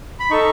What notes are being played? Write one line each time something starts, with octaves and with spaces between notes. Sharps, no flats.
B5
D#4 A4 C#6